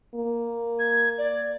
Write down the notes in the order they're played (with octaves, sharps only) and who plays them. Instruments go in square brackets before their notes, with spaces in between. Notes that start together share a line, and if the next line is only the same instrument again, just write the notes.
[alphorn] A#3
[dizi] G#6
D5